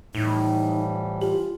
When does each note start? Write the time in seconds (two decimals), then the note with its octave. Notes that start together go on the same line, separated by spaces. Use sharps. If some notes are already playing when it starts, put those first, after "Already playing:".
0.15 A2 E3 F3 G3 D#4
1.22 F4 G4